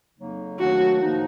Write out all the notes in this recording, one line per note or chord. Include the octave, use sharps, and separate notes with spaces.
F2 C#3 F#3 A#3 D#4
D#2 D#3 F#3 A3 D4 F#4
A2 F3 A#3 D#4